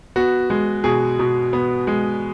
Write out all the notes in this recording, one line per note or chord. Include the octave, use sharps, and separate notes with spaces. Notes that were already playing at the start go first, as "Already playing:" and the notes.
B3 F#4
G#3
B2 G#4
B2
B3
G#3